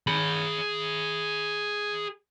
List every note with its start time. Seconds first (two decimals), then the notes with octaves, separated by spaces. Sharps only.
0.07 G#4 B5